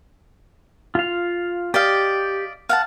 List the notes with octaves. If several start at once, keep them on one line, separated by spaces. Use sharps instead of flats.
F4 F5
G4 D5 D#5 F5
F5 F#5 A5